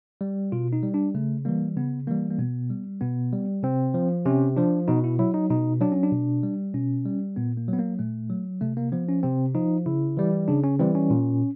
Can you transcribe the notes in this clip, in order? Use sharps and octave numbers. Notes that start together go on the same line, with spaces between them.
G3
B2 F4
D#4
G3
D4
C#3 A3
E3 G3 A#3
C#3 B3
E3 G3 A#3
A#3
B2 B3
G3
B2 B3
G3
C3 C4
F3
C3 C#4
F3 D4
B2 D#4
E4
F#3 E4
D#4
B2 D#4
F#3 D4
C#4
D4
B2
G3
B2 C#4
G3
A#2 B3
A#3
F#3
B3
A#3
A#2 A3
F#3
C3 A3
A#3
F3 B3
C#4
C3 C4
F3 D#4
C#3 E4
E3 G3
C#3 D4
C#4
E3 G3 C4
C#4
A#2